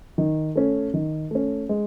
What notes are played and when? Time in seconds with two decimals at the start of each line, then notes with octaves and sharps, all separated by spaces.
0.18 D#3
0.56 A3 C#4
0.94 D#3
1.31 A3 C#4
1.69 G#3